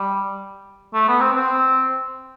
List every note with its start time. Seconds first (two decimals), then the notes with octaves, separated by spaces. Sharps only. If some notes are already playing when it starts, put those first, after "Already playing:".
Already playing: G3
0.94 A3
1.08 B3
1.21 C4
1.35 C4